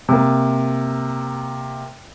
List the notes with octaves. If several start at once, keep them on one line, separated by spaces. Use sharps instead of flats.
C3 A#3